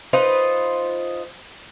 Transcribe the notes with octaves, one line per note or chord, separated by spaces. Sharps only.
D#4 F4 B4 C5